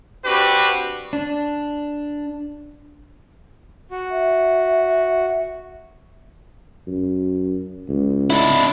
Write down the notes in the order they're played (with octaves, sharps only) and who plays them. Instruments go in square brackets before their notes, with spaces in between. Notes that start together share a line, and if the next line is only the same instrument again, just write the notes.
[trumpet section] C4 D4 F#4 G4 B4
[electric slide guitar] D4
[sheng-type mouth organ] F#4
[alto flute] E5
[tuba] F#2
C#2
[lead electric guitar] D4 E4